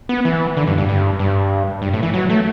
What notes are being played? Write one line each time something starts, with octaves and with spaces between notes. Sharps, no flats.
B3
E3
D3
G2
G2
G2
G2
G2
A2
E3
F#3
A3